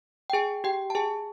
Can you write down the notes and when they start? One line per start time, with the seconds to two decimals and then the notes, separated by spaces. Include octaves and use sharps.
0.30 G5
0.33 G#4 G#5
0.64 G4 G5
0.90 A5
0.95 G#4 G#5